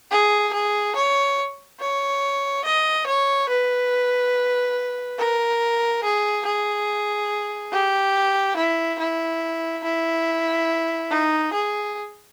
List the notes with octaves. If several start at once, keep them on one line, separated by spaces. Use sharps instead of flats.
G#4
G#4
C#5
C#5
D#5
C#5
B4
A#4
G#4
G#4
G4
E4
E4
E4
D#4
G#4